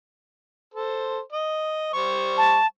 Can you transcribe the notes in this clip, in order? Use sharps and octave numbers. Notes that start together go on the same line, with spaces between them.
A4 C5
D#5
G3 C5 C#6
A5